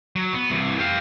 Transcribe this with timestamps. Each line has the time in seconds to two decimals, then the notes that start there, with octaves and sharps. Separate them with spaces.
0.16 F#3
0.33 B3
0.50 C2 E3
0.79 G4 F5